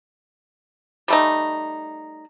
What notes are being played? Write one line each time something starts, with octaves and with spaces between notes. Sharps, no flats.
G3 A3 D#4